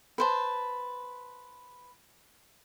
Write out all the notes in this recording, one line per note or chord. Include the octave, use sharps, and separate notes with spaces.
B4 C5 A5